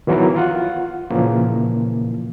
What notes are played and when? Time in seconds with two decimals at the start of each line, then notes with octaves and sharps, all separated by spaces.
0.07 D#3 E3 F#3 B3 E4 A#4
0.36 F4 F#5
1.10 A#2 C#3 E3 F3 A#3